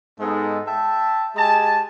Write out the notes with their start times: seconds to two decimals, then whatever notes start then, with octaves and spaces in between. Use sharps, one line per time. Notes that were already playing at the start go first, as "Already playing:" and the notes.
0.20 G#2 G#3 B3 D#4 A4
0.67 E5 G5 A5
1.36 G#3 G4 G#5 A5